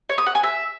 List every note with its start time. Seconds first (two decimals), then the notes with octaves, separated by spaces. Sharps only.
0.09 C#5
0.18 D#6
0.26 F#5
0.35 G#5
0.43 E5